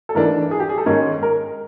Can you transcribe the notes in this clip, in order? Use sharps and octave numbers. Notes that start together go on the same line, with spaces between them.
A4
G#2 E3 A3 D4 A#4
G#4
G4
G#4
A4
G#2 D#3 G#3 C#4 A#4
A#4